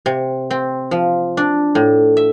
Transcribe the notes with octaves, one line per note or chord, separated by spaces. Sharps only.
C3
C4
F3
D4
A2
E5